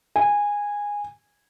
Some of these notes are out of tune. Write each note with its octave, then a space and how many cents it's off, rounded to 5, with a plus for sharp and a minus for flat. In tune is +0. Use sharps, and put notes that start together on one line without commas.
G#5 -15